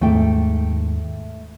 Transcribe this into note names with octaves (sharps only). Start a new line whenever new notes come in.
D#2 G#2 A3 G5